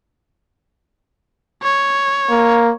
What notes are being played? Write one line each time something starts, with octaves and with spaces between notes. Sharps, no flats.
C#5
A#3